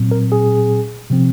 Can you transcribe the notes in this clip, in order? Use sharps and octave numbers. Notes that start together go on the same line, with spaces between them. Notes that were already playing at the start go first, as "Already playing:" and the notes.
Already playing: A#2 F#3 C4
A#4
G#4
C3 F3 C4